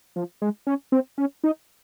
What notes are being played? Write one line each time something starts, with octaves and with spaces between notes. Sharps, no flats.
F3
G#3
C#4
C4
C#4
D#4